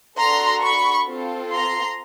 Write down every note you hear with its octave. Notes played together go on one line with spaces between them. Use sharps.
D4 F#4 A4 A#5 C6
B5 C#6
C4 F4 A4
A#5 C6